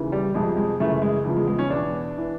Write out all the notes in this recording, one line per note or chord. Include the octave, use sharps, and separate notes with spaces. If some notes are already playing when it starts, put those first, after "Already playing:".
Already playing: D#2 C#3 E3
G3
F2 C3 F3 G#3
G#3
F#2 C#3 E3 A3
G#3
E2 C#3 F3
G#3
G#3
C#4
E2 B2 D4
E3